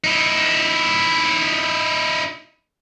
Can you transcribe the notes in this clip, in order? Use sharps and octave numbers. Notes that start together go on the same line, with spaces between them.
D#4 E4